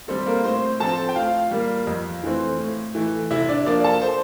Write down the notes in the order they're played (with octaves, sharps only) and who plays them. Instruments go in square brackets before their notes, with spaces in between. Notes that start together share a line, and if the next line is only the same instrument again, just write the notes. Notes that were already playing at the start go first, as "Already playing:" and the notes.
[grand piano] G3 C4 A4
A#3 A#4
A2 C4 C5
F3 C4 A4 A5
G5
A2 F4 F5
G3 A#3
F2
E3 A3 C4
A2
E3 A3
C3 E4 E5
D4 D5
F3 A#3 D4 D5
A4 A5
C5 C6